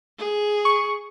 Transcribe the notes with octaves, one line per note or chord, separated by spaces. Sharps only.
G#4
C#6